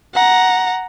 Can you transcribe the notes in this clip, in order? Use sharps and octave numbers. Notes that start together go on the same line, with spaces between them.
F#5 A#5